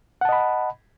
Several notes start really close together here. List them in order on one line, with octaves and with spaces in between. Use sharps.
F#5 A5 D#5 B5